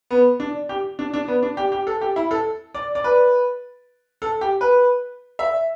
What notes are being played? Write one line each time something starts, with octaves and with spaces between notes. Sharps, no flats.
B3
D4
G4
D4
D4
B3
D4
G4
G4
A4
G4
E4
A4
D5
D5
B4
A4
G4
B4
E5